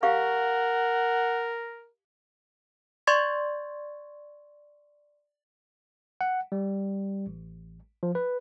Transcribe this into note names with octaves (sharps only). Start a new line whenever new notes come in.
G4 A#4 F5 F#5 C#6
D5 C6 C#6 G#6 A6
F#5
G3
A1
F3
B4